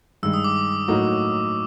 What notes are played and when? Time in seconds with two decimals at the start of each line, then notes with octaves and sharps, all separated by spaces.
0.23 G2 D#3 G#3 E6
0.34 D#6
0.44 D6
0.88 A2 F#3 A#3 D#4 F#4 C#6